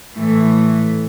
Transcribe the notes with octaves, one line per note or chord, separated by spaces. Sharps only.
A2 E3 A3